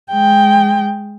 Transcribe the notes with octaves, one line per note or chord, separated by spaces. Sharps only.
G#3 G5